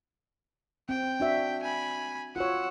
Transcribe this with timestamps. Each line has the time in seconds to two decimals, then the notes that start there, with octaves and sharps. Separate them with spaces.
0.89 C4 G5
1.20 D4 F#4 E5
1.63 G#5 B5
2.36 F4 F#4 C#5 F#5 E6